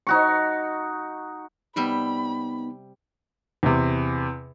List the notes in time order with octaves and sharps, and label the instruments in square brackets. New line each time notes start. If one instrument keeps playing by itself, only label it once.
[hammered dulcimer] D#4 F#4 C#6
[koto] C3 G3 E5 [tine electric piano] B3 D#4 [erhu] B5
[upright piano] E2 C3